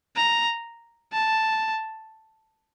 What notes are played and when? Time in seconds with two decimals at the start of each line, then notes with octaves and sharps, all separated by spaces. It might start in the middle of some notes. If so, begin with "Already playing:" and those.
0.16 A#5
1.13 A5